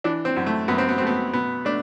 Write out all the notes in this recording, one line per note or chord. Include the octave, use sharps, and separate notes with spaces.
E3 D4
C4
F#2
A3
F#2 B3
C4
B3
A3 C4
B3
B2 B3
A3 D4